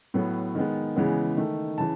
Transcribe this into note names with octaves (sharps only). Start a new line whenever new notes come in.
A2 F#3 B3
D#3 G#3 B3
C#3 E3 G#3 B3
D#3 A3
C#3 E3 A5